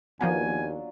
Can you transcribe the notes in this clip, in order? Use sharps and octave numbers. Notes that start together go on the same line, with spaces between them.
D#2 F3 F#3 A#3 B3 D4 F4 G#5